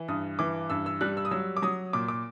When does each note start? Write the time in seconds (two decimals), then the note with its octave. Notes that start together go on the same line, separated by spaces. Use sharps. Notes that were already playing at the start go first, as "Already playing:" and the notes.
Already playing: E3
0.08 G2 D#6
0.39 E3 D6
0.70 G2 E6
0.86 E6
1.01 G3 F#6
1.17 E6
1.25 D#6
1.31 F#3 E6
1.57 D6
1.62 F#3 D#6
1.93 A#2 D6
2.08 D6